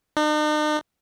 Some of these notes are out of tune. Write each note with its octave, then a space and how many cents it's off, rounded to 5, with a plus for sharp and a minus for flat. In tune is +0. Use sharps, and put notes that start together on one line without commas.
D#4 -45